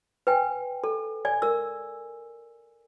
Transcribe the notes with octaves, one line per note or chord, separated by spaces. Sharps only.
B4 G5 G#5
A4
D5 G#5
A#4 E6